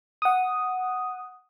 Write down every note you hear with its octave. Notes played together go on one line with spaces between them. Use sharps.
F#5 D#6